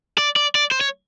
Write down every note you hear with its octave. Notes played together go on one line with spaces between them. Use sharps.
D5
D5
D5
C5
C#5